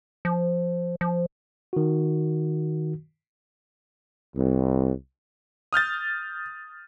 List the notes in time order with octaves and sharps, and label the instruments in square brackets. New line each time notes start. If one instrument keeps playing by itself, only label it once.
[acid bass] F3
F3
[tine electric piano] D#3 F#4
[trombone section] C2
[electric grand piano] D#6 F6 G6 A6